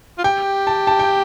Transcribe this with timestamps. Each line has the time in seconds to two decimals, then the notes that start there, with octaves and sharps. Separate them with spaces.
0.18 F4
0.24 G4 G5
0.67 A5
0.87 A5
0.99 G5